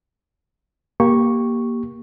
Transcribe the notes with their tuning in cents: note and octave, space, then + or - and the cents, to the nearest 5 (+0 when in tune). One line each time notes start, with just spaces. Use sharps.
A#3 +15 G4 +0 C#6 -5